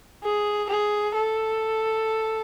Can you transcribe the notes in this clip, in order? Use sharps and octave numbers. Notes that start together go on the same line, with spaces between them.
G#4
G#4
A4